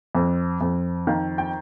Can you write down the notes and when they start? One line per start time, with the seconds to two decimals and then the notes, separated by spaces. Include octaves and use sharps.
0.15 F2
0.61 F2
1.07 D#3 F5
1.38 G5